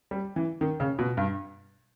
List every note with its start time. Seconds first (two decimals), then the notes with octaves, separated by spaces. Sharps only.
0.11 G3
0.36 E3
0.61 D#3
0.80 C#3
0.99 B2
1.17 G2